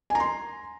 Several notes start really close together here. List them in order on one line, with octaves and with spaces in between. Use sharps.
G#5 A#5 C6